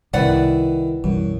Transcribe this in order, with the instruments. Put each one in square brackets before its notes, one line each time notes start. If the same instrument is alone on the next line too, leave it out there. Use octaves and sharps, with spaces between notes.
[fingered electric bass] C2 [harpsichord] D#3 E4 [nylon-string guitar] B4 D5 F#5
[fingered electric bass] B1 E3 G3 [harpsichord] F#2